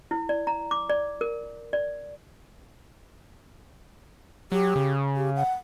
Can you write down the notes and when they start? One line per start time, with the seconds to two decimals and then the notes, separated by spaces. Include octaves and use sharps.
0.11 E4
0.29 D5
0.47 A#5
0.71 D6
0.90 D5
1.21 A#4
1.73 D5
4.52 F#3 G4
4.76 C#3
5.16 G4
5.36 F#5